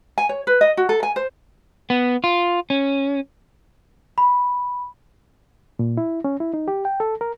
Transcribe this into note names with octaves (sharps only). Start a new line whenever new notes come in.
G#5
C#5
B4
D#5
F#4
A4
G#5
C5
B3
F4
C#4
B5
A#2
E4
C#4
E4
D#4
G4
G5
A4
A#4